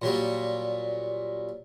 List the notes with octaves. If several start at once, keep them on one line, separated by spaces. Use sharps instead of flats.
A#2 F#3 G3